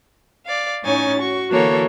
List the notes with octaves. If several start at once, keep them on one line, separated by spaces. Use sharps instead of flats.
D5 F5
A2 C#4 D#4 C#5 G#5 A6
F#4 C#6
D3 E3 A#3 F#4 A4 C#5